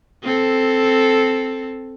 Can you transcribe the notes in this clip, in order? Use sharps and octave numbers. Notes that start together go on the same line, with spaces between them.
C4 A4